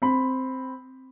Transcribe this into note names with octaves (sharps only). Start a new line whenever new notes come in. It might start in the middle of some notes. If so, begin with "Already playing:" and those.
C4 B5